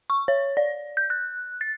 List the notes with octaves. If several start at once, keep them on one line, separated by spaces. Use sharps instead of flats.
C#6
C#5
D5
G6
F#6
A6